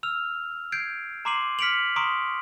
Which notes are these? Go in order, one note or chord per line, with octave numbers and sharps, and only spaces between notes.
E6 F6 F7
G6 G#6 C7 D7
A#5 C6 D6 C7 D#7 F#7
F6 B6 C#7 D7 F7 F#7
A#5 C6 C#6 D#6 D7